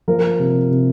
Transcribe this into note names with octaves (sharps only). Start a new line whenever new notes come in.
F3 A#4
C3
C3